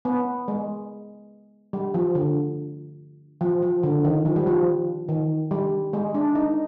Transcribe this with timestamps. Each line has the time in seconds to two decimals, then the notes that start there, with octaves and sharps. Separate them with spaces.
0.05 B3
0.48 G#3
1.73 G3
1.94 F3
2.15 D3
3.41 F3
3.62 F3
3.83 D3
4.04 D#3
4.25 F3
4.36 G3
4.47 F3
5.09 D#3
5.51 G3
5.93 G#3
6.15 D4
6.35 D#4